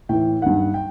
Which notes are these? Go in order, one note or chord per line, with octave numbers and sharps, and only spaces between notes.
A2 E3 G5
G2 D#3 F#5
G5